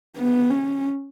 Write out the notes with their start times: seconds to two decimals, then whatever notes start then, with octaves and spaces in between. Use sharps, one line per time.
0.17 B3
0.50 C#4